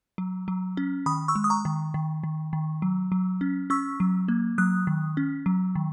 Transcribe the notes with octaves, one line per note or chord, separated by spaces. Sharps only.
F#3
F#3
C#4
D#3 B5 D#6
C#6 E6
G#3
D#6
A#5 C#6
D#3
D#3
D#3
D#3
F#3
F#3
C#4
C#4 C#6 E6
F#3
A#3
F#3 D#6 F#6
D#3
C#4
F#3
D#3